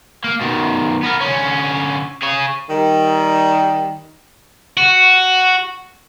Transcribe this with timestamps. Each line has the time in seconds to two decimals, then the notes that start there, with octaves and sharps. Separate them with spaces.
0.24 A#3
0.41 B2 D#3
1.03 B3 A#4
1.20 D3 C#4
2.23 G#4 C#5
2.70 D#3 G3
4.77 F#4